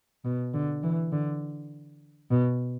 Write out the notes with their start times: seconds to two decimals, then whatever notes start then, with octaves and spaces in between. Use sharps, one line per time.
0.25 B2
0.54 D3
0.83 E3
1.12 D3
2.31 B2